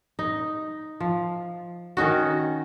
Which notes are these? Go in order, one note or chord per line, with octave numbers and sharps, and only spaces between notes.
D#4
F3
D#3 C#4 D#4 F#4